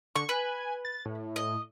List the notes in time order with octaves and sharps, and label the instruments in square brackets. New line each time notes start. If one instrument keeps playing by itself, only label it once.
[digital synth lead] D3 [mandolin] C#6
[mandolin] B4 [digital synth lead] G#5
[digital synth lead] A6
A2
[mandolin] D#5